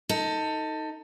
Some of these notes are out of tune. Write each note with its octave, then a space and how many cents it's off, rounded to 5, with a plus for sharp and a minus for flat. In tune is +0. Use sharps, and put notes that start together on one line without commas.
D#4 +15 A4 +20